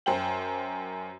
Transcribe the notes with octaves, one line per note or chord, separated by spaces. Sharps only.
F#2 C5 G5 F#7